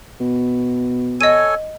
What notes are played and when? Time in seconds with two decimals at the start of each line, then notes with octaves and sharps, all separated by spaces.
0.20 B2
1.21 A4 C#5 D#5 G#5 D#7